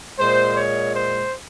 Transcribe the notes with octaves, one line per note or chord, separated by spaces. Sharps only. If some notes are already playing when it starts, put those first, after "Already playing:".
A#2 G#3 C5
C#5
C5